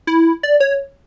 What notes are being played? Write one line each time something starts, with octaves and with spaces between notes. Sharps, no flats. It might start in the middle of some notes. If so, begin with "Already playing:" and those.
E4
D5
C#5